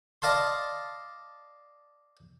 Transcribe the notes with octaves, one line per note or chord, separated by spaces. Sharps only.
D5 D#5 F5 A5 C6